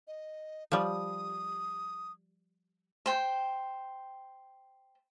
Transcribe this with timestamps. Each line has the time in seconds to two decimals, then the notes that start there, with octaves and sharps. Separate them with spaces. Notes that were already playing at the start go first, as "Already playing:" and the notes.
0.08 D#5
0.72 F3 G3 D#6
3.06 C5 G5